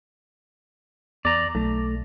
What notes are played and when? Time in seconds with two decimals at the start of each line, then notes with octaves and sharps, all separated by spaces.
1.25 E2 D5 A#5
1.55 B1 A3